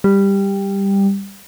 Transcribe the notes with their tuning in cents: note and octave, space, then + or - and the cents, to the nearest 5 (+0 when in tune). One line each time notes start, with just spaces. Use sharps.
G3 +10